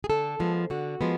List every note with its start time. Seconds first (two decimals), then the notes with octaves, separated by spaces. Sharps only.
0.04 G#4
0.10 D3 A4
0.40 F3 G#3 B3
0.70 D3 F#4
1.01 F3 G#3 B3